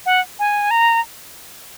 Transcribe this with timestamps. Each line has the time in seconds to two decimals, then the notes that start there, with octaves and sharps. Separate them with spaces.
0.06 F#5
0.39 G#5
0.71 A#5